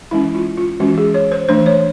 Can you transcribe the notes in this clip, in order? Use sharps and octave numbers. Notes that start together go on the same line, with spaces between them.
E3 G#3 C#4 E4
F4
F4
E3 G#3 C#4 F#4
G#4
C#5
C5
E3 A3 D4 C5
C#5